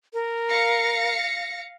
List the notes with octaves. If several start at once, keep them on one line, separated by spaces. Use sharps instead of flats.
A#4
F5 A#6 C#7